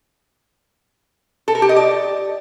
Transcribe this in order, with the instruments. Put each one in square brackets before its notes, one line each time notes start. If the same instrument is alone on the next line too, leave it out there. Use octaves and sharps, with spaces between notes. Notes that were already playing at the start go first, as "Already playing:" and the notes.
[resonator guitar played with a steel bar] A4
A#4
G4
D#5
D5